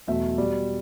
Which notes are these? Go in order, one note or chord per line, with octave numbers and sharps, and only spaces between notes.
E2 B2 F#3 A3 E5
B2 G3 D5